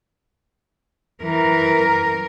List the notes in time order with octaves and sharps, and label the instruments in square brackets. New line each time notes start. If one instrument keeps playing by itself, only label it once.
[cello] E3 [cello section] A#4